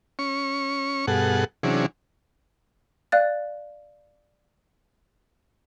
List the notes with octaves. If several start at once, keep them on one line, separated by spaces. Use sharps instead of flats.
C#4 C#6
G2 B2 G#4 A4 F#5
C3 E3 F#3 C#4 D4 G#4
D5 F5 F#6 A6